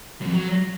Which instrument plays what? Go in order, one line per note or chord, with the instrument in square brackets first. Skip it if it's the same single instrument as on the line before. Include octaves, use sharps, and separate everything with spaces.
[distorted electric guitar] F#2
F2
F#3